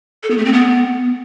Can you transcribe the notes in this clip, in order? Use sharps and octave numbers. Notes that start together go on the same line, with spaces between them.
A4
B3
A3
C4
B3